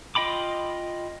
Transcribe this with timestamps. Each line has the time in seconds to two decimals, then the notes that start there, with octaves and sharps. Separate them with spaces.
0.15 F4 D#5 G5 B5 D6